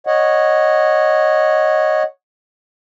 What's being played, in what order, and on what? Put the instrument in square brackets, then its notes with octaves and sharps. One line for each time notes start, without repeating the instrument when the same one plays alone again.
[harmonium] C#5 D#5 F#5